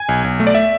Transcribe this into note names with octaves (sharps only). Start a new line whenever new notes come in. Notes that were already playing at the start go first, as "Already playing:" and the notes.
Already playing: G#5
B1
B1
A3
D5
E5